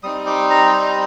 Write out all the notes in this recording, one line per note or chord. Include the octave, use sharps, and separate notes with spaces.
G3 C4 D#4 D#6
D6
A#5
A#5